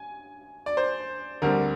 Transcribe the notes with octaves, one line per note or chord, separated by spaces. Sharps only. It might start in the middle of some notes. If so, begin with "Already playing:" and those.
Already playing: G#5
D5
C5
D2 D3 G3 C4 A#4